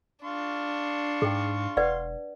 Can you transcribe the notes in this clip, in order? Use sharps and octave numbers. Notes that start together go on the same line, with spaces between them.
D4 F5 C6 C#6
G#2 G#4 G5
E1 B4 D5 F#5